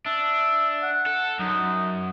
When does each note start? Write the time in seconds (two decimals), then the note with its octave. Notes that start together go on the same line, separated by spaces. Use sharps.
0.06 D4 E5
0.83 F#5
1.07 A4
1.40 F#2 D#4